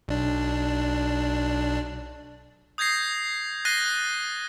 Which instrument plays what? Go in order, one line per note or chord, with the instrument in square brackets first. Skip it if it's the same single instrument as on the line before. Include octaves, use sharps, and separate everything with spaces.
[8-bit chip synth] B1 D4
[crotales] D#6 G6 G#6 A#6 C7
F#6 A6 A#6 C7 D#7 G7